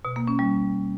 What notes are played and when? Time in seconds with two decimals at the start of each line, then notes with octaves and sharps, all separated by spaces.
0.05 B2
0.16 A#3
0.28 C#4
0.39 G3